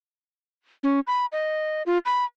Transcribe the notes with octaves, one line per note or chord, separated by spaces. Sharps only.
C#4
B5
D#5
F4
B5